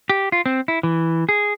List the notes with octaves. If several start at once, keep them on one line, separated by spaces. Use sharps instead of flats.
G4
F4
C4
E4
E3
G#4